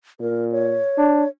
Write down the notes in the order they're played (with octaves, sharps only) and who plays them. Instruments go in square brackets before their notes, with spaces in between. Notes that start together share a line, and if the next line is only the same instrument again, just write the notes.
[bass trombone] A#2 [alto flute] A#4
[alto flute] C#5
[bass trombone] D4